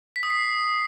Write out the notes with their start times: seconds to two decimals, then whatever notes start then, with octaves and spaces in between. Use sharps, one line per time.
0.16 B6
0.23 D#6
0.30 C7